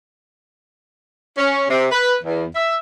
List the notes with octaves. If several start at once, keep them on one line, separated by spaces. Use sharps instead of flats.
C#4
C3
B4
E2
E5